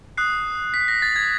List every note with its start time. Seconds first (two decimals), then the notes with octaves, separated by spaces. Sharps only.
0.17 D#6 F#6 C7
0.74 B6
0.88 A#6
1.02 A6
1.16 G#6